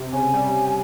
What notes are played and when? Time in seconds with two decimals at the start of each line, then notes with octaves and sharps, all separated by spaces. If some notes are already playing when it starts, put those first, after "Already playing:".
Already playing: C3
0.13 C#3 G#5
0.34 G3